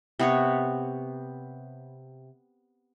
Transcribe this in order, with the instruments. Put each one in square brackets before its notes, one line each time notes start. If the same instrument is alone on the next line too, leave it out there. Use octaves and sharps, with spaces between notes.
[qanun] C3 B3 C#5